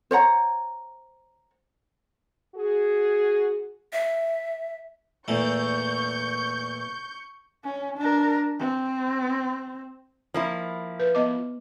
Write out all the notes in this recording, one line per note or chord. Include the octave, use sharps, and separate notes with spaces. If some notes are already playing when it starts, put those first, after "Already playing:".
C5 C#5 F#5 A#5
F#4 G#4
E5
E2 A#2 A3 C#6 G6
C#4
D4 A#4
C4
F3 A#3 E4
B4
B3 D#5 D6